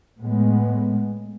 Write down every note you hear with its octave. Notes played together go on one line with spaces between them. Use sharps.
A2 G#3 B3